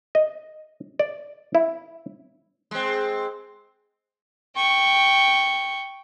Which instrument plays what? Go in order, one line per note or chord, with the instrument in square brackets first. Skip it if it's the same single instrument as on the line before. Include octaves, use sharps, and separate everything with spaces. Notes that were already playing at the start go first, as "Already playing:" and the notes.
[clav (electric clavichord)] D#5
D5
E4
[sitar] G#3 C4
[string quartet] G5 C#6